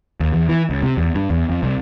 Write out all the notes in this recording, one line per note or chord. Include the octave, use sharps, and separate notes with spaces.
D#2
E2
E3
C#2
C3
E2
G2
E2
F2
C2